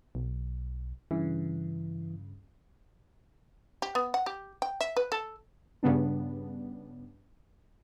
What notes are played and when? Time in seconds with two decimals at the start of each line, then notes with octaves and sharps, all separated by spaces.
0.15 B1
1.11 G2 C#3 E3
3.82 G4
3.95 B3
4.14 F#5
4.26 G4
4.62 G5
4.81 E5
4.96 B4
5.12 A4
5.83 G2 C#3 G3 B3 D4